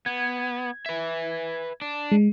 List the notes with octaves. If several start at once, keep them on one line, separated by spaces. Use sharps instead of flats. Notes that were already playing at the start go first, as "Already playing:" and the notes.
B3 G#6
B4 E5
D4
G#3